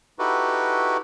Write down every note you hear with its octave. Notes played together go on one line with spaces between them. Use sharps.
D#4 E4 F#4 G4 A4 B4